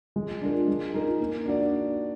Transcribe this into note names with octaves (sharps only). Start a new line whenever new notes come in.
G#3
D4 F4 A#4
G#3
D#4 A#4
A#3
D4 F#4 D5